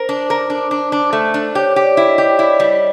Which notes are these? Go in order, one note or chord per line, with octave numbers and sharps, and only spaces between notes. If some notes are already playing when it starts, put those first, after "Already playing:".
Already playing: A#4 C5
D4
A#4
D4
D4
D4
A3
D4
G4 C#5
G4
D5
E4
D#5
G4
E4 D5
G3